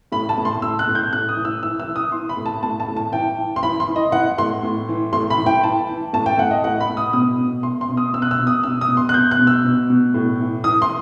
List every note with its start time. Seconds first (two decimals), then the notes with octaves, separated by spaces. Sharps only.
0.12 A2 B5
0.29 A5
0.38 A2
0.45 C6
0.62 A2 E6
0.79 F#6
0.87 A2
0.95 G6
1.13 A2 F#6
1.29 D#6
1.37 E3
1.45 E6
1.63 E3 E6
1.80 E6
1.88 E3
1.96 D#6
2.12 E3 C6
2.29 B5
2.37 A2
2.46 A5
2.63 A2 A5
2.80 A5
2.88 A2
2.97 A5
3.13 E3 G5
3.38 E3
3.56 C6
3.63 E3 B5
3.80 C6
3.88 E3
3.96 D#5
4.12 E3 F#5
4.38 A2 C6
4.63 A2
4.89 E3
5.13 A2 C6
5.30 B5
5.38 E3
5.46 G5
5.64 E3 A5
5.89 E3
6.13 A2 A5
6.26 G5
6.38 A2 F#5
6.51 D#5
6.63 A2 F#5
6.80 B5
6.89 A2
6.97 D#6
7.13 B2 D#6
7.38 B2
7.63 B2 C6
7.81 C6
7.89 B2
7.97 D#6
8.14 B2 E6
8.22 F#6
8.31 E6
8.39 B2
8.47 D#6
8.63 B2 E6
8.81 D#6
8.88 B2
8.97 C6
9.09 F#6
9.14 B2 G6
9.31 F#6
9.39 B2
9.47 E6
9.64 B2
9.90 B2
10.14 A2
10.40 E3
10.64 E3 D#6
10.82 C6